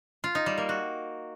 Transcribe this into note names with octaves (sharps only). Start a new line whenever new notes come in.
F4
D#4
G3
A#3
F#4